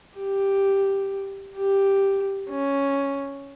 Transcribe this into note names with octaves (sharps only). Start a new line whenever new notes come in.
G4
G4
C#4